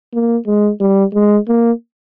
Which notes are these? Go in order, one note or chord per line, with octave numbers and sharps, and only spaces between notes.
A#3
G#3
G3
G#3
A#3